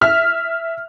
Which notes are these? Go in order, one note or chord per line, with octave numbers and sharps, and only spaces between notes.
E5 F6